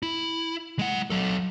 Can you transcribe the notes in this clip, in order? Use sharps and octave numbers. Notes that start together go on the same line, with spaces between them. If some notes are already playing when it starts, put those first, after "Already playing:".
E4
G#3 F#5
F#3 A4